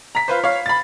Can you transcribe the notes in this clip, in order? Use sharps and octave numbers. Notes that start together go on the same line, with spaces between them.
A#5 B6
F4 B4 C5
C#5 F5
B5 A6